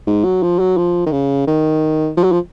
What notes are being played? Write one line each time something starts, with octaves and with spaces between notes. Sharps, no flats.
G#2
F#3
F3
F#3
F3
D#3
C#3
D#3
F3
F#3
F3